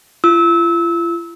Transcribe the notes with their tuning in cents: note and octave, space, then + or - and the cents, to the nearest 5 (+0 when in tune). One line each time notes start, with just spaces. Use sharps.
F4 -45 E6 -25